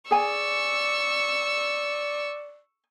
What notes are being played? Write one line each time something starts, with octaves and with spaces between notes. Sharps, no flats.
G#4 D5 G#5 C#6 E6